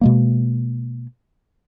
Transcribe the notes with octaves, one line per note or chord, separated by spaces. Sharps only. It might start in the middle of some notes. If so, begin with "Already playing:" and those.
B2 G#3 A#3